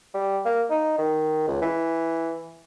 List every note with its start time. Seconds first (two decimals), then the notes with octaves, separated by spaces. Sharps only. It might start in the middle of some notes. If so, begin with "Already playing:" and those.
0.14 G3
0.45 A#3
0.70 D#4
0.98 D#3
1.48 C#2
1.62 E3